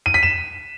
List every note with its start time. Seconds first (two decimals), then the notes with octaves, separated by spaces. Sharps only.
0.06 D#7
0.14 B6
0.23 E7